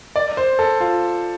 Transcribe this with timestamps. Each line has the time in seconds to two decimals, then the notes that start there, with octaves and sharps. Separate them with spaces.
0.16 D5
0.37 C5
0.59 A4
0.80 F4